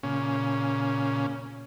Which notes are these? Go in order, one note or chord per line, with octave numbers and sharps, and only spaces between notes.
A#2 C#3 C#4